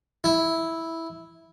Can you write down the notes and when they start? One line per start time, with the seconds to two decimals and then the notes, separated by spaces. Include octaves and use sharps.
0.24 E4